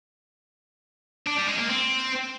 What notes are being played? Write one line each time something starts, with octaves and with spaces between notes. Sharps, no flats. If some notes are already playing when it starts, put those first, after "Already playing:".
D4
G3
G#3
A#3
C4